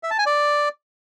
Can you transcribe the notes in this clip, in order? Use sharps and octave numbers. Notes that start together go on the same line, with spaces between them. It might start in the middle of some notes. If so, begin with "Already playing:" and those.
E5
A5
G#5
D5